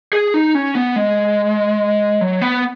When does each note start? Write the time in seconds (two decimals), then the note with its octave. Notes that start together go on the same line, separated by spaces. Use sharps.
0.13 G#4
0.34 D#4
0.55 C#4
0.75 B3
0.96 G#3
2.21 F#3
2.41 B3